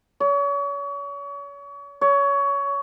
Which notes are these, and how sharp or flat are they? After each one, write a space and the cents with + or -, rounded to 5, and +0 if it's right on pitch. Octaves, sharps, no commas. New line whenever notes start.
C#5 +35
C#5 +20